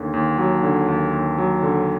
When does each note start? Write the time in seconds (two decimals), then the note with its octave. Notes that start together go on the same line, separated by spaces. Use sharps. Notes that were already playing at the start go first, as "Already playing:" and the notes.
Already playing: D#2 D3
0.13 D#2
0.38 F#3
0.63 D3
0.88 D#2
1.13 D#2
1.38 F#3
1.63 D3